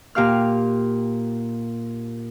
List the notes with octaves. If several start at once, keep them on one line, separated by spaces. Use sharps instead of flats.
A#2 G4 F5 F6